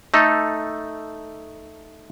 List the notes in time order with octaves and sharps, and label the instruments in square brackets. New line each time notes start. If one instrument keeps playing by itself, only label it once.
[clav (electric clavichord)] A3 D#4 A4